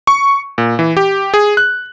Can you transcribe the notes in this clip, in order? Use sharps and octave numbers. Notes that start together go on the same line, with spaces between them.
C#6
A#2
E3
G4
G#4
F#6